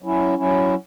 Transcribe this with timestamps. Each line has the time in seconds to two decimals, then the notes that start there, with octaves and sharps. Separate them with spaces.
0.02 F#3 C#4 E4
0.38 F#3 C#4 E4